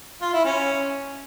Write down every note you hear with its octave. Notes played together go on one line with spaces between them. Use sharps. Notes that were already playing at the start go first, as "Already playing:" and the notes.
F4
E4
C#4